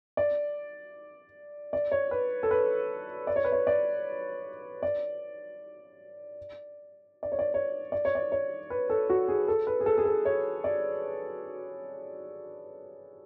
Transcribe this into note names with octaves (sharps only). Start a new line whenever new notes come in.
D5
D5
C#5
B4
A4
B4
D5
C#5
B4
C#5
D5
D5
D5
C#5
D5
C#5
D5
C#5
D5
C#5
B4
A4
F#4
G#4
A4
B4
G#4
A4
G#4
A4
C#5
D5